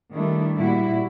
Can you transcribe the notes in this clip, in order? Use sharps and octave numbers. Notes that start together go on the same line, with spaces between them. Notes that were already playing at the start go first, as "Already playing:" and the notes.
D#3 G3 A3 D4 E4
A#2 G3 E4 F#4